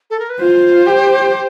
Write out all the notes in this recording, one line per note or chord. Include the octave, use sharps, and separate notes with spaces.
A4
A#4
B4
F4 C5
G4